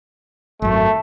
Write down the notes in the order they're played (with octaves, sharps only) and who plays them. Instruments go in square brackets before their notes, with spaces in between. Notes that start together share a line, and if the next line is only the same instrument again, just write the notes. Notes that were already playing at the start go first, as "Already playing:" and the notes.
[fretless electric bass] G#1 F#2 [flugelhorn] A3